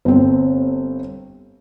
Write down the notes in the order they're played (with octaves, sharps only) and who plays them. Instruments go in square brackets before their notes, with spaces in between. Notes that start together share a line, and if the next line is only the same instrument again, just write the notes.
[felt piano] G1 C4